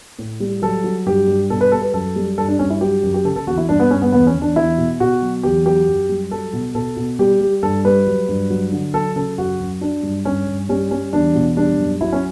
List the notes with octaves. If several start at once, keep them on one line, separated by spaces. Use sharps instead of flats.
A2
G3
F#3 A4
F#3
G2 G4
G2
B2 A4
B4
G3 A4
B4
F#2 A4
G3
G2 A4
D4
G2 C#4
E4
F#3 G4
F#2
G4
C#3 A4
A4
E2 F#4
E4
G2 D4
B3
G2 C#4
B3
E2 B3
C#4
E2
D4
E2 E4
B2
B2 F#4
F#3
E2 G4
F#3 G4
F#2
G3
F#3 A4
B2
B2 A4
B2
G3 G4
G3
G2 A4
G3 B4
F#3
G2
F#3
D3
F#3 A4
C#3 A4
F#2 F#4
F#2
F#3 D4
G2
G2 C#4
G2
G3 C#4
G3 C#4
E2 D4
B2
G3 D4
F#2
F#3 E4
C#4